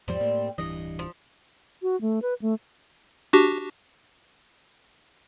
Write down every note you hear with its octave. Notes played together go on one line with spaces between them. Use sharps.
E2 G#2 F3 G3 C4
A2 A#3
D1 G2 E3 D#5
F3
F#4
A3
B4
A3
D4 F#4 G4